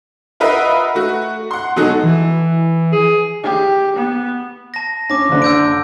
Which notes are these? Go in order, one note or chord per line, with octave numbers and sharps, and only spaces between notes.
F4 A#4 B4 D#5 E5 F#5
A3 F#4
F#5 C6
B2 F#3 G#3 D#4 F#4 A4
E3
G#4
G4
B3
A5 A#6
C#4 D6 A#6
F#1 D3
E6 G6 D7